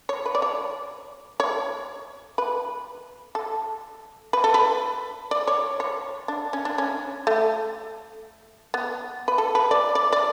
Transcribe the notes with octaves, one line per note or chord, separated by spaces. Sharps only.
C#5
B4
D5
C#5
C#5
B4
A4
B4
A4
B4
D5
C#5
C#5
D4
C#4
D4
C#4
A3
B3
B4
A4
B4
D5
D5
D5